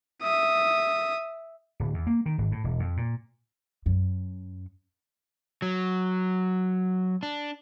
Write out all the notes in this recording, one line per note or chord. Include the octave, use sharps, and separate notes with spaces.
E5 D#6
D1
E2
A#3
D#3
G#1
A2
E1
F2
A#2
F#2
F#3
D4